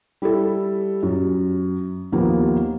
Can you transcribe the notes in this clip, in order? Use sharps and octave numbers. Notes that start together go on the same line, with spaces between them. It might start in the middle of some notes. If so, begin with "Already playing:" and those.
G3 E4 A4
F#2
D#2 F3 A#3 B3